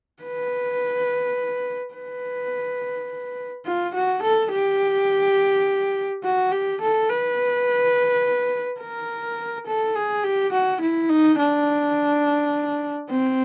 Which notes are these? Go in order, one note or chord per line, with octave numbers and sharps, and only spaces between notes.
B4
B4
F4
F#4
A4
G4
F#4
G4
A4
B4
A#4
A4
G#4
G4
F#4
E4
D#4
D4
C4